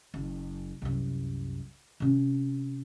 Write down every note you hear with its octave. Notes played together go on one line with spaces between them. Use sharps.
F#1
C2 F#2
C3 C#4